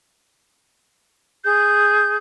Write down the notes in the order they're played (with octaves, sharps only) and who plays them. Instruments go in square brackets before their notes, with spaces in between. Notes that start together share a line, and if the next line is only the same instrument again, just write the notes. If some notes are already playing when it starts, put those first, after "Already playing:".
[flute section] G#4 G6